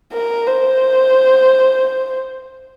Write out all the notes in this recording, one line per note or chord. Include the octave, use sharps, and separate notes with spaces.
A#4
C5